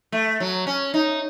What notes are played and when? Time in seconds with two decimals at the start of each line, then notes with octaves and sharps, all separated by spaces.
0.12 A3
0.40 F#3
0.67 C#4
0.94 D#4